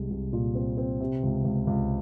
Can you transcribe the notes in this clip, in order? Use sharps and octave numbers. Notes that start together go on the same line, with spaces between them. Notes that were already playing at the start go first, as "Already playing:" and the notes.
Already playing: C2 G#3
C2
A#2
C4
C4
C3
C#2
C#2
C#2